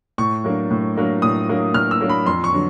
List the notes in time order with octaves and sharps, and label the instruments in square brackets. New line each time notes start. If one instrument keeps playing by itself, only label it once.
[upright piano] A2 C#6
F#3 A#3 D4
A2
F#3 A#3 D4
A2 D#6
F#3 A#3 D4
A2 F6
E6
F#3 A#3 D4
B5
F2 C6
C#6
D3 F#3